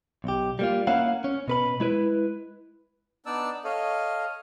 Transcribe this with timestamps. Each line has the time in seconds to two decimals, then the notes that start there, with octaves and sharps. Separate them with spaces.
0.24 B1 G4
0.59 G3 A#3 F4
0.87 A#3 C#4 E4 F5 F#5
1.24 C#4
1.48 B2 B4 B5
1.80 G#3 E4 B4
3.26 B3 D4 D#4 D5 A5 E6
3.64 A4 C#5 D#5 F5